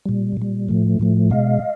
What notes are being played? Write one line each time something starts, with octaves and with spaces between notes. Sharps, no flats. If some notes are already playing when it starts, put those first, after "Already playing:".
A#2 G3
A#2 G3
A2 F3 A3
A2 F3 A3
B2 G#3 D#5 F5